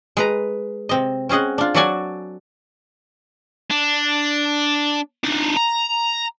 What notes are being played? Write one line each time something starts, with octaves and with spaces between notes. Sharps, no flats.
G#3 B4 A#5
C3 C4 D#5
C4 C#4 G#4 D#5 F#5
D4 F4
F#3 F#4 A4 D5 F#5 G#5
D4
D4 D#4
A#5